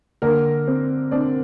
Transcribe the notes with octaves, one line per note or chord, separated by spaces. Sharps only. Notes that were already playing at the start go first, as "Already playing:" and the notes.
D3 A#3 A#4
C4
C4 D4 D5